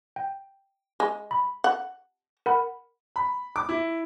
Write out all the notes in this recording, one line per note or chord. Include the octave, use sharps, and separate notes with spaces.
G5
G#3
B5
F#5
A#4 F#5 B5
B5
D6
E4